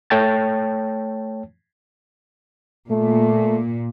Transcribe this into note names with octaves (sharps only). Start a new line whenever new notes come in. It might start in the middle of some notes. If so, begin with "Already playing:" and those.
A3 C#5 G5 A5 A6
A#2 A3